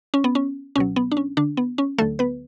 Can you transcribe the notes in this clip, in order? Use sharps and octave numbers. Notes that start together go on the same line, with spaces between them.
C#4
B3
C#4
C#2 B2 F#3 C#4
B3
D4
C#4
D3 D4
B3
C#4
D2 D3 F#3 A3 A4
B3 B4